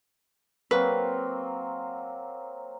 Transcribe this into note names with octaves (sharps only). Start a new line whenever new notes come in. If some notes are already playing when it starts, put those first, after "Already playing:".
F#3 A#3 C4 B4